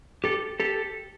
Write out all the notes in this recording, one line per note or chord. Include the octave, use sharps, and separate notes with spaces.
G4 A4
G4 A4